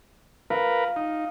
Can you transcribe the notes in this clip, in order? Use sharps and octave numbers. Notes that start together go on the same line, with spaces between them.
A#4 B4 F5
D#4